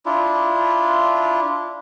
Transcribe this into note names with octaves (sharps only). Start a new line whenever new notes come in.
D4 E4 F4